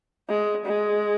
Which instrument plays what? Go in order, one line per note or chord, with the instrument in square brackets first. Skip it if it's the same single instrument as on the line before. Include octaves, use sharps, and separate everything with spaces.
[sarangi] G#3
G#3